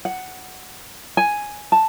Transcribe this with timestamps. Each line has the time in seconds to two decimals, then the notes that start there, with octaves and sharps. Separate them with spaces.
0.05 F#5
1.17 G#5
1.72 A5